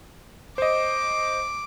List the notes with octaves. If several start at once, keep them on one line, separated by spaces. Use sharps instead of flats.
C5 D#5 D6